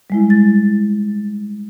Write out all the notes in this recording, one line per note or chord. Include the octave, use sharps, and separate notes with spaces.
G3 G#3 E4
A6